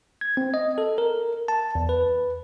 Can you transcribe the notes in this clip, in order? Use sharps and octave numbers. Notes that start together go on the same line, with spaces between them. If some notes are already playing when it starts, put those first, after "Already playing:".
G#6
C4
D#5
A4
A#4
A5
E2
B4